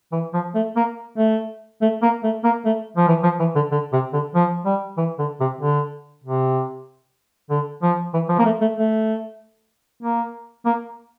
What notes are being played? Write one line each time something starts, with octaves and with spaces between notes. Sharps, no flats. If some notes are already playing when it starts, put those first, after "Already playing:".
E3
F3
A3
A#3
A3
A3
A#3
A3
A#3
A3
F3
E3
F3
E3
D3
D3
C3
D3
F3
G3
E3
D3
C3
D3
C3
D3
F3
E3
F3
A#3
A3
A3
A3
A#3
A#3